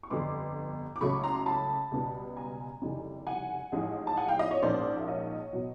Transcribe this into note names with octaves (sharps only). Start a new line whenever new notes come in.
C#6
G1 F2 D3 G3 B3 C6 D6
D6
C#2 C#3 F#3 A3 B5 C#6
A#5 C6
C6
A5 B5
C#2 B2 G3 B3
G#5 A#5
F#1 F2 C3 D#3 G3
F#5 G#5
A1 G#2 F3 G#3
A5
F#5 G#5
F5 G5
D#5 F5
C#5 D#5
A#1 G#2 F3 A#3 C#4 C5 D5
E5
C#5 D#5
B2 F#3